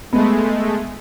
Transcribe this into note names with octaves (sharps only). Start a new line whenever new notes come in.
G#3 A3 B3